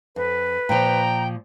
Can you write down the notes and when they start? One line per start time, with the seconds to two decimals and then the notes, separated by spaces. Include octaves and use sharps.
0.16 F2 B4
0.69 A#2 F3 G5 A#5